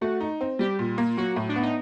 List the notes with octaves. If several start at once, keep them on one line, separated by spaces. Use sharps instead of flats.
A3 F#4
D#4
C4
G3 G4
A#2
A#3
F#3 F#4
A2
D4
B3
D#4